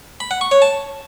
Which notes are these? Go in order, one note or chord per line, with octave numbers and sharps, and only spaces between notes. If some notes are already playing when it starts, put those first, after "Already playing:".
B5
F#5
C#6
C#5
A5